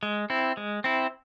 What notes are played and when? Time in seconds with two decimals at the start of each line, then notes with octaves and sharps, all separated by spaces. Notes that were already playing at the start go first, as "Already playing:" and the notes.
0.03 G#3
0.30 C4 E4
0.57 G#3
0.84 C4 E4